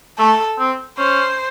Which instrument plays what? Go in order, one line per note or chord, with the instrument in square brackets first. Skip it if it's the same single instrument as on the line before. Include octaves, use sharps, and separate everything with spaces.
[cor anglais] A3 [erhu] A4
[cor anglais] C4
[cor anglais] C#4 [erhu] C5